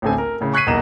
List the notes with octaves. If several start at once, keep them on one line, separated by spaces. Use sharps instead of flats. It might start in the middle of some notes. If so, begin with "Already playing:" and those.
A1 D2 C4 A4 G#5
A#4
A2 C#3
C#6 F#6 G#6 B6 C7 D#7
B1 E2 A#3 D#5 A#5 E7